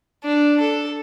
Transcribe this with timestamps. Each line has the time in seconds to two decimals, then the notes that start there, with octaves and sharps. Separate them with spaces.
0.24 D4
0.60 A4